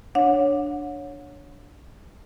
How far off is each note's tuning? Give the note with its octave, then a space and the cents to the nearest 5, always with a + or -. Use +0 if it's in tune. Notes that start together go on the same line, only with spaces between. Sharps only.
D4 +0 C#5 +0 F#5 -40